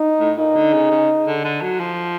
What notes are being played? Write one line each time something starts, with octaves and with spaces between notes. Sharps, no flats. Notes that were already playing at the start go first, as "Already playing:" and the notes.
Already playing: D#4
A2
A#2 D#4
D3
C#3
C#3
D3
D3
F#3
F3